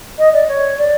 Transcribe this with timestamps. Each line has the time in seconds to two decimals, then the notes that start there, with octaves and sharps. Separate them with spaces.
0.18 D#5
0.33 D5
0.48 C#5
0.78 D5